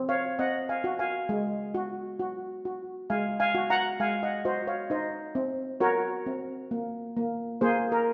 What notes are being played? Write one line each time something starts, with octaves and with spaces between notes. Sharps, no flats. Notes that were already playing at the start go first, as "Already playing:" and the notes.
Already playing: C4
C#5 F5
C4 D#5 F#5
F5 G#5
F#4
F5 G#5
G#3
F#4
F#4
F#4
G#3 F5 G#5
F5 G#5
F#4
F#5 A#5
G#3 F5 G#5
D#5 F#5
F#4 C5 D#5
C#5 F5
D#4 C5 D#5
C4
F#4 A#4 C#5
C4
A#3
A#3
A#3 G#4 C5
A#4